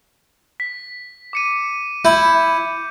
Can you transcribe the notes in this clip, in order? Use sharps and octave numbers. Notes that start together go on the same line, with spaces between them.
B6
D6 C#7 D#7
E4 G6